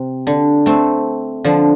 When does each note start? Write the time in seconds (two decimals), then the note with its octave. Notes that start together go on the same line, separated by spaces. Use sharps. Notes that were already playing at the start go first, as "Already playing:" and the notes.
Already playing: C3
0.27 D3
0.66 A3 C4
1.44 D3 F3